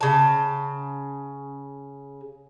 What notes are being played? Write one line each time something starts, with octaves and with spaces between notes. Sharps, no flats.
C#3 A5